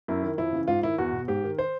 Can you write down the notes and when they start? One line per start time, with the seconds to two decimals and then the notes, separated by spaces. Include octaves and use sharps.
0.08 F#2 E4
0.22 D#3
0.38 F2 E4
0.53 C#3 E3
0.68 G#2 F4
0.83 D#3 E4
0.98 E2 F#4
1.13 B2
1.28 G#2 G4
1.44 D#3
1.59 C5